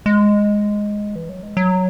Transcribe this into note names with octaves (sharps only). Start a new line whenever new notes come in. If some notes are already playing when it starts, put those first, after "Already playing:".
G#3
E3
F#3
G#3
F#3